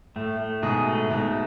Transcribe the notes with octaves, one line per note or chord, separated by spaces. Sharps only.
A2 A3
A3
G#2 B2 G#4
A3
G#2 B2 A3